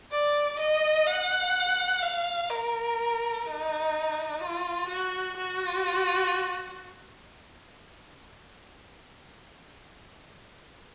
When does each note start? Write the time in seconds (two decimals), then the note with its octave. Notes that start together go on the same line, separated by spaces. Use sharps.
0.11 D5
0.59 D#5
1.07 F#5
2.02 F5
2.50 A#4
3.46 D#4
4.40 F4
4.88 F#4
5.37 F#4